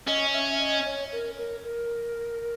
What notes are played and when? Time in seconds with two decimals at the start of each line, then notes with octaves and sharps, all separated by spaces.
0.07 C#4 D#5
0.33 E5
0.59 D#5
0.86 C#5
1.12 A#4
1.38 A#4
1.64 A#4